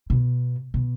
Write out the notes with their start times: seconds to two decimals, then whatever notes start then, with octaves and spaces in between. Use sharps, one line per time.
0.10 B2
0.74 B2